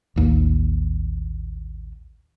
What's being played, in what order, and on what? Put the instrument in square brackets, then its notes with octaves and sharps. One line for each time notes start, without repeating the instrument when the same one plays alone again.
[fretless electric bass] A1 D#2